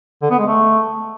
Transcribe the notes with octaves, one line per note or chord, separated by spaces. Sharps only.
D3
B3
G#3
A3